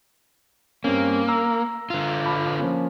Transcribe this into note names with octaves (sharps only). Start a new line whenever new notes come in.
G2 A#3 C4 C#4
A#5 E6
D3 F4
A5 B5 D6
F3 A#3 C#4